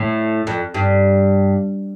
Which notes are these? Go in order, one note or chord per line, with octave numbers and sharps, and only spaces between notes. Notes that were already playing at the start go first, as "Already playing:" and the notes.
Already playing: A2
F2
G2